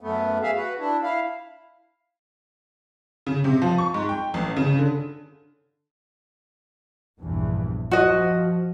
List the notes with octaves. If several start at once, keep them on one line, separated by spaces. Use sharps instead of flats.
F#2 A3 B3
G#4 E5 F5
F#4 B4
D4 E4
E4 F5
C#3
C3
F3
C#6
G#2
G5
A1
C#3
D3
A#1 E2 G2
F3 F#4 D#5